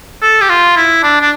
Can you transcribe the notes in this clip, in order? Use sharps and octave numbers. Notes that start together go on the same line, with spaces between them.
A4
G4
F4
E4
D4
D4